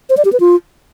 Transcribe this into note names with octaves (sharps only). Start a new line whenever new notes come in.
C5
D5
G4
B4
F4